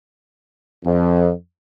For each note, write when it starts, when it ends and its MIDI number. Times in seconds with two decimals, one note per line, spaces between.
0.85 1.32 41